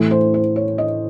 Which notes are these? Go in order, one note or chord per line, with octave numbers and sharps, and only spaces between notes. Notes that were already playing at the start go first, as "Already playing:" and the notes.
Already playing: A2 E3 A3
C5
C5
C#5
D#5